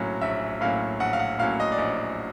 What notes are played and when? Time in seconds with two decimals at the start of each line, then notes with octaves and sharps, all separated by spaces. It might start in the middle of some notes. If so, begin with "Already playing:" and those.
Already playing: A#1 A2 F#3 A#3 C#4
0.21 A#1 E5
0.61 A2 F#3 A#3 C#4 F5
1.00 A#1 F#5
1.13 F5
1.19 F#5
1.39 A2 F#3 A#3 C#4 F5
1.60 D#5
1.72 D5
1.78 A#1 D#5